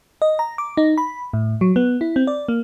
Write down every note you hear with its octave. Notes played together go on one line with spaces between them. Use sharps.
D#5
A#5
D6
D#4
B5
A2
F#3
B3
E4
C4
D5
A#3